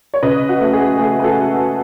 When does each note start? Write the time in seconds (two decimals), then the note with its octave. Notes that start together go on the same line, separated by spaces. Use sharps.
0.14 C#5
0.23 C#3 B4 D#5
0.49 F#4
0.60 A3
0.73 G#4
0.98 A3 G#4
1.20 B4
1.23 F#4 A4